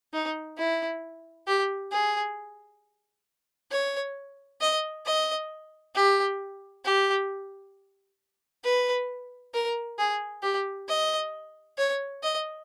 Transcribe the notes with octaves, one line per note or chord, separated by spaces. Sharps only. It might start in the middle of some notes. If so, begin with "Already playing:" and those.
D#4
E4
G4
G#4
C#5
D#5
D#5
G4
G4
B4
A#4
G#4
G4
D#5
C#5
D#5